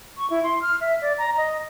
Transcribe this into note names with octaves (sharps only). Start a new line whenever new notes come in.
C#6
E4
C6
F6
E5
D5
A#5
D#5